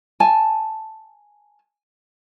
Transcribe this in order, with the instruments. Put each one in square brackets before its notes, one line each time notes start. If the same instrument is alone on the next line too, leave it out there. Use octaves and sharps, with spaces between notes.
[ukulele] G#5 A5